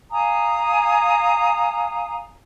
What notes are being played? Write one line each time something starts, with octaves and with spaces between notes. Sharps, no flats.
F5 G#5 A#5 D#6